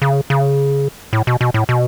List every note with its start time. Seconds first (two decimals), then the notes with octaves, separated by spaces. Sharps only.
0.02 C#3
0.30 C#3
1.13 A2
1.27 B2
1.41 B2
1.54 A2
1.69 B2